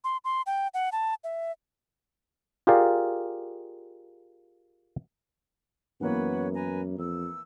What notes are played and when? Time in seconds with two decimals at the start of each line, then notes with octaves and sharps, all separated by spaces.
0.04 C6
0.25 C6
0.46 G5
0.74 F#5
0.92 A5
1.24 E5
2.67 F4 G4 G#4 A#4 D5 F5
6.01 F#2 E3 A#3 B3 B4 C#5 F#5
6.55 B4 G#5 A#5
6.98 F2 E6